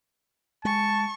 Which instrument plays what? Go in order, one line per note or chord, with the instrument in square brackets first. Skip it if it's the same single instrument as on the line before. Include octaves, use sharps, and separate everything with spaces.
[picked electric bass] G#3 [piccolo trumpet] A5 [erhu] C#6